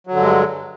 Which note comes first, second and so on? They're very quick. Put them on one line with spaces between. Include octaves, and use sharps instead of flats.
F#3 D3 G2 G#3